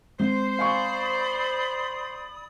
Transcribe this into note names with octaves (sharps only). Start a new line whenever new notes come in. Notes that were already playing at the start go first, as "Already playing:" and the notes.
G#3 C4 C5
D5 F5 G#5 B5 C#6 D#6